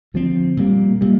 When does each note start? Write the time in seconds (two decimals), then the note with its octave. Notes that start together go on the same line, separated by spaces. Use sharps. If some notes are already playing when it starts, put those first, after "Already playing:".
0.14 D3 F3 C4
0.57 A#2 G3 A#3
1.01 A#2 G3 A#3